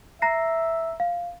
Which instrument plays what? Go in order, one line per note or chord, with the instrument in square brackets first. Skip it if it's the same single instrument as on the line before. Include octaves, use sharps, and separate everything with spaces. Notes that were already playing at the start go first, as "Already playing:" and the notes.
[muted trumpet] E5 [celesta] A#5 A#6 C7
[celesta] F5